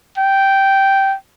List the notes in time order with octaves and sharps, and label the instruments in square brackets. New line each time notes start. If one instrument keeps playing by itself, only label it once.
[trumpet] G5